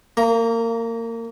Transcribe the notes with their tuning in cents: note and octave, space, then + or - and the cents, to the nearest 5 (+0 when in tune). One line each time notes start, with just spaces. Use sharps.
A#3 -25 A#5 +10